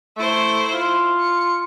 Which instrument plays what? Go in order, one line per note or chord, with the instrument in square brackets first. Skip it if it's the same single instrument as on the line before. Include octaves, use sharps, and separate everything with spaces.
[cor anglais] A3 [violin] E4 C5
[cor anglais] F4
[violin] C#7